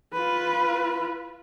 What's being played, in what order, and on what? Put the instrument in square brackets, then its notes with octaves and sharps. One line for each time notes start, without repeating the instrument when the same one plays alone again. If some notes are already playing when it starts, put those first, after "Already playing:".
[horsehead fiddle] F4 B4